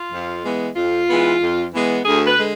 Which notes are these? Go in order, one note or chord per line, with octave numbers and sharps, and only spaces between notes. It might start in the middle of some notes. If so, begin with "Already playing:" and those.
Already playing: F4
F2
E3 G#3 B3
F2 F4
E3 G#3 B3
F2
E3 G#3 B3
D2 G#4
B4
D3 G#3